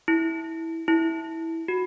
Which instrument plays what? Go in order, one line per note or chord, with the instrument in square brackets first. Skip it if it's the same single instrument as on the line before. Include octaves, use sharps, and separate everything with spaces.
[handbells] E4
E4
F#4